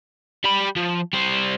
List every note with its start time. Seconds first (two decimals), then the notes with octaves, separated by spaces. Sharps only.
0.44 G3 B5
0.76 F3
1.13 G3 C5